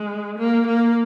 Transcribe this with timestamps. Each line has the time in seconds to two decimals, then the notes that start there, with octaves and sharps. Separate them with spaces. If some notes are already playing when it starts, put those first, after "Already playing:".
Already playing: G#3
0.38 A#3
0.67 A#3